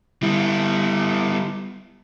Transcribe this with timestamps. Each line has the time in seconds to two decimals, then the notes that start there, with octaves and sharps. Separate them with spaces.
0.23 G3 B3 E4